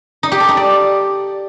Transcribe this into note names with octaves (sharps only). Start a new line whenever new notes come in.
D#4
G4
A4
D#4
D5